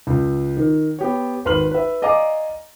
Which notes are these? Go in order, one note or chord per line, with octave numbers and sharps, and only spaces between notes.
C#2
D#3
B3 G4 C#5
G#1 B4 C6 F6 F#7
B4 E5
D5 D#5 F5 G#5 A#5 D6